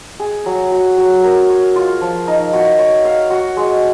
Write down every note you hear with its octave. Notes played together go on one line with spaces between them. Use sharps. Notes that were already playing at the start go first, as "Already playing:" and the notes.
G#4
F#3
F#4
F#3
A#4
C#5
F4
F3
D#4
F#4
C#5
F5
F#4
G#3